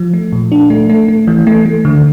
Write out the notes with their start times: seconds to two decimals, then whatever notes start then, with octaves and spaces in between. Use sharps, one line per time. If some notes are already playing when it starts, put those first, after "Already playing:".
Already playing: F3
0.14 A3
0.33 A#2
0.52 D4
0.70 A3
0.90 A3
1.08 A3
1.27 E3
1.47 A3
1.66 A3
1.85 D3